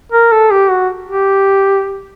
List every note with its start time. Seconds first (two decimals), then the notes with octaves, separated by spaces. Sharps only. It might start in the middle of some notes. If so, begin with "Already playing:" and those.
0.12 A#4
0.32 A4
0.51 G4
0.71 F#4
1.09 G4